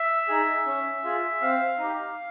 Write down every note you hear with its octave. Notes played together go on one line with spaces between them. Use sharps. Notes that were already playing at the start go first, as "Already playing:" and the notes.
Already playing: E5
D#4 G#4
C#4
F4 G#4
C4 F5
D#4 G4